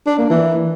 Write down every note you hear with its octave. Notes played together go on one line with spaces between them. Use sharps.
D4
A#3
E3